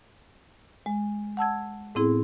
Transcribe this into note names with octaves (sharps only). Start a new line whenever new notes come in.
G#3
F#5 A5 E6 G#6
A2 B3 C4 E4 G#4